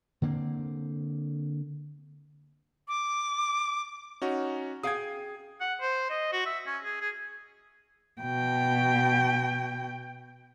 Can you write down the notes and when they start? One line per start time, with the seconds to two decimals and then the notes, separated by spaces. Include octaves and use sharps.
0.22 D3 A#3 C4
2.88 D6
4.22 C#4 D#4 F#4
4.83 G#4 F5 G5 D#6 G#6
5.60 F#5
5.81 C5
6.10 D#5
6.33 F#4
6.46 E5
6.66 C#4
6.84 G#4
7.01 G#4
8.21 B2 G5